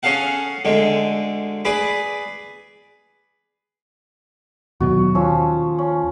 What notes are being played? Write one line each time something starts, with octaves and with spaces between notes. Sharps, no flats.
C#4 G#4 A4 F5 F#5
D2 D3 G#3
G#4 B4 D5 B5 D6
D#2 B2 F#3 F#4
D#2 F3 C#4 E6
C#4